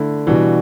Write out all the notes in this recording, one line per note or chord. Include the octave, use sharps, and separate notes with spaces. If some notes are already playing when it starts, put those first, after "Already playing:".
Already playing: D3 A3 E4
B2 E3 G3 D4 F#4